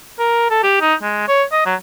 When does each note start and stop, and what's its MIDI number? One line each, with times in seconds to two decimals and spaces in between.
0.19 0.47 70
0.50 0.60 69
0.63 0.77 67
0.81 0.94 63
1.03 1.27 56
1.28 1.44 73
1.52 1.63 75
1.66 1.75 54